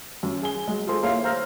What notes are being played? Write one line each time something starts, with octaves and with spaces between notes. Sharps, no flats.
F#2
G#4 G#5 G7
F#3 G#3
F4 G#4 A4 C5 C6
A#3 E4 C#5 F5
C5 F5 A#5 E6 F6 A#6